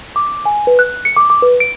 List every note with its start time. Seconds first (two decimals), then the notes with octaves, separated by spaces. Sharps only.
0.16 D6
0.45 G#5
0.67 B4
0.79 F#6
1.05 C#7
1.17 D6
1.30 D6
1.42 B4
1.60 D7